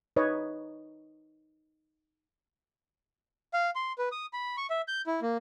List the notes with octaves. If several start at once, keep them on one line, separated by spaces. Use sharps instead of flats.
D#4 B4 C#5 D#5
F5
C6
B4
D#6
B5
C#6
E5
G6
E4
A#3